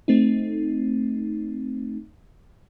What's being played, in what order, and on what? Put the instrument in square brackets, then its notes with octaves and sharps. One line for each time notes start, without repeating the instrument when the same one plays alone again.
[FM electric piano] A3 C4 D#4